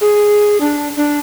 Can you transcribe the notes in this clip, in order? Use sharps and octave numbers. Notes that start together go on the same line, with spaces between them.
G#4
D4
D4